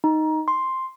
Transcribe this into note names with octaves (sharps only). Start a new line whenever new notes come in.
D#4
C6